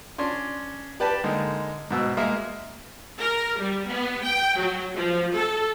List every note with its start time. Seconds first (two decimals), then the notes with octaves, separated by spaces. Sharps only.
0.18 C#4 D4 C6
1.00 G4 B4 D5 G5 A5
1.24 D3 G#3 A#3 D#4
1.91 G#2 B2 E6
2.17 G#3 A#3 A#4 E5
3.20 A#4
3.58 G3
3.88 B3
4.23 G5
4.58 F#3
4.96 F3
5.34 A4